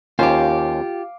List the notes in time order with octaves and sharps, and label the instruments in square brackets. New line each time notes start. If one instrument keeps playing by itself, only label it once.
[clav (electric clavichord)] D#2 C#4 C5 [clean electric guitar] F4 G4 [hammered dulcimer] F5 D6